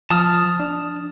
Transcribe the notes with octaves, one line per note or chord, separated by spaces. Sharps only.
F3 A5 D#6 F6
D4